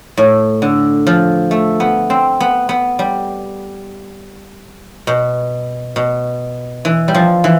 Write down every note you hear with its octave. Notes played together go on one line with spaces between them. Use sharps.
A2
D3
F3
A3
B3
C4
B3
B3
G3
B2
B2
E3
G3
F3
E3